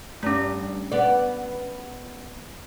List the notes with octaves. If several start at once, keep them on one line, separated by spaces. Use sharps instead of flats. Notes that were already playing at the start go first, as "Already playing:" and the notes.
G2 A3 C#4
B3 D5